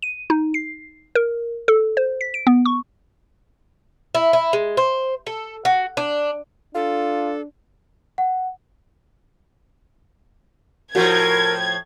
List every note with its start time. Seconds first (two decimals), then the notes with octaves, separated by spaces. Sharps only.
0.02 D#7
0.30 D#4
0.54 C7
1.15 A#4
1.68 A4
1.97 C5
2.21 B6
2.34 D7
2.47 B3
2.65 C#6
4.15 E4
4.33 E4
4.53 G#3
4.77 C5
5.27 A4
5.65 F#4
5.97 D4
6.75 D4 F4 A4
8.18 F#5
10.95 A2 F3 F#4 A#4 G#6